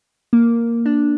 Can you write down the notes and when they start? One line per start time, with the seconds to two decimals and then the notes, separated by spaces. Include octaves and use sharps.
0.33 A#3
0.86 D4